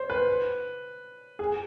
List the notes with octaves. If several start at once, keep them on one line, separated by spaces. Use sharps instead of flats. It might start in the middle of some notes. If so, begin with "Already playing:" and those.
Already playing: C5 C#5
B4
G#4